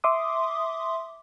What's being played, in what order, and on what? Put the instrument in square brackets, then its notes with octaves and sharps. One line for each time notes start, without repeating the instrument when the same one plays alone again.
[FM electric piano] E5 C6 D6 D#6